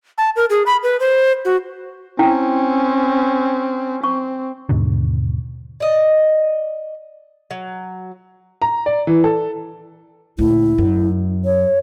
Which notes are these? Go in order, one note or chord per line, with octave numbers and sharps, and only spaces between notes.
A5
A#4
G#4
B5
B4
C5
F#4
C4 C#4 E4 G5
C4 C#6
D#2 G#2 B2 D3
D5 D#5
F#3
A#5
D5
E3
A4
D2 A#2 E4
F#2
C#5